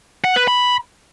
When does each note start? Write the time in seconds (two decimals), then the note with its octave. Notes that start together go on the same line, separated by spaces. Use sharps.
0.24 F#5
0.36 B4
0.48 B5